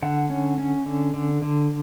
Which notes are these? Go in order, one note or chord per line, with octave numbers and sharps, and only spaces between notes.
D3 F#5
C#4
C#4
D3
D3
D3